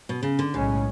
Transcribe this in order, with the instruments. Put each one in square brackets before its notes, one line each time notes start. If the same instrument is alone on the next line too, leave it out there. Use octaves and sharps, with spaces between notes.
[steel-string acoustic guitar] B2
C#3
D3
[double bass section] B1 A2 G#3 C#4 [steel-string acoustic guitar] C#3